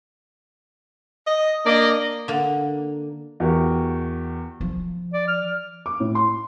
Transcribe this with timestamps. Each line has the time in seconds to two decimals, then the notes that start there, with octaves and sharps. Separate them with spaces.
1.27 D#5
1.66 A#3 D4 D5 D#5
2.28 D3 A#3
3.40 E2 F#4 G4 A#4
4.61 F3
5.14 D5
5.28 F6
5.86 D6
6.00 A2
6.15 C6